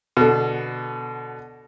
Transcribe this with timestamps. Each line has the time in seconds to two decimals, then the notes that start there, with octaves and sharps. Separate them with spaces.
0.17 B2 D3